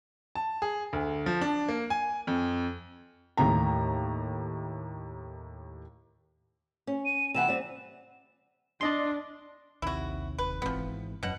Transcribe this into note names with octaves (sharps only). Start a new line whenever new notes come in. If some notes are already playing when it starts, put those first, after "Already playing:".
A5
G#4
D2
F3
D4
A#3
G#5
F2
D#2 A2 A#5
C#4
D#7
C3 E3 F#5 E7
G3 C4
D4 D5 D#5 C6
A#1 D#2 C3 E4 F#4
E1 B4
G#1 E3 F3 B3 C4
E1 F#2 B2 F#3 C#4 F#5